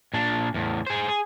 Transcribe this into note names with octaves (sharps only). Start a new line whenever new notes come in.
A#2 D4
E2 A2
G#4 C5
G#4